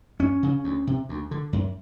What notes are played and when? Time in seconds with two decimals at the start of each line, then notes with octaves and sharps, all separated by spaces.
0.19 F#2 C#4
0.43 C#3
0.64 D2
0.87 C3
1.09 D2
1.31 D3
1.53 F#2